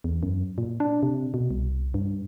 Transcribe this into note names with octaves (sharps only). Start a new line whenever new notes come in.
E2
F#2
A#2
D4
C3
B2
C2
G2